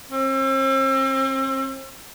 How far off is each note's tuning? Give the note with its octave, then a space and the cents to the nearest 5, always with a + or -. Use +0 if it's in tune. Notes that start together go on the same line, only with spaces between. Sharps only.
C4 +40